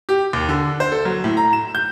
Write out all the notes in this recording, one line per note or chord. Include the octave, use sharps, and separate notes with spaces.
G4
D#2
D3
C5
A4
F#3
A2
A#5
E7
G6